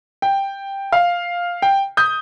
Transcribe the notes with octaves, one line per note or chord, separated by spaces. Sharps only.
G5
F5
G5
D#6 G6